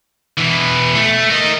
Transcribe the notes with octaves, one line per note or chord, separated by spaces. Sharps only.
B2 E3
A3
A#4 D#5